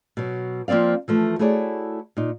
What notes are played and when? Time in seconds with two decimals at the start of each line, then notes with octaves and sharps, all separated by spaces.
0.17 B2 F#3
0.68 F3 A#3 C4 D5 F5
1.08 E3 F3 A3
1.39 A3 E4 F#4 G#4 C#5 D5
2.17 A#2 D#4